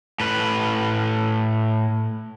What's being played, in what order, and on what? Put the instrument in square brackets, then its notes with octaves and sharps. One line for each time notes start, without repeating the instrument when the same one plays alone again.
[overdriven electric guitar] A2 B4